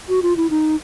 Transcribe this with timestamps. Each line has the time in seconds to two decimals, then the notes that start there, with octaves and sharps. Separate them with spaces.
0.09 F#4
0.22 F4
0.37 E4
0.50 D#4